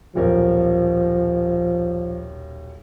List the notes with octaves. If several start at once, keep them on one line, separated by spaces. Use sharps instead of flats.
D#1 B1 F3 A#4